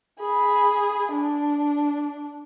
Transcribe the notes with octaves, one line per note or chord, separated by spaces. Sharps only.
G#4 B5
D4